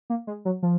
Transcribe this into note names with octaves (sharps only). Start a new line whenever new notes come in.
A#3
G#3
F#3
F3